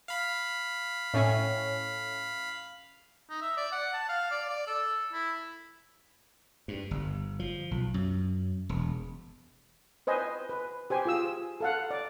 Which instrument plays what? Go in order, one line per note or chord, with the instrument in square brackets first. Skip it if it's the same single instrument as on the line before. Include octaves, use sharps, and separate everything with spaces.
[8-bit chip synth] F5 B5
[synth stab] A2 C#4
[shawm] D#4
E5
D5
F#5
A5
F5
D5
D5
A4
E4
[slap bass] G2
G1
F3
B1
F#2
E1
[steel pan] B4 C5 D#5 G#5
B4
G4 C5 G#5
F4 G#4 E6
A4 F5 F#5
D5